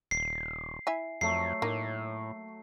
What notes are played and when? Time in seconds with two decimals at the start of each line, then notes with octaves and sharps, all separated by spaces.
0.11 D#1 C7
0.87 E4 E5 G#5
1.21 F2 F#3 A3 C7
1.62 A2 A#3 D#4